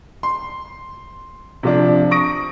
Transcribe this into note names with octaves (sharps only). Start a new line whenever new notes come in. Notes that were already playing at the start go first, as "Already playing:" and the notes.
C6
C3 F3 D4
C#6 D#6 A#6 D7